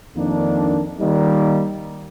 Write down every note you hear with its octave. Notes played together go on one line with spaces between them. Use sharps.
F2 D#3 A#3 D4
D#3 G3 A#3 D#4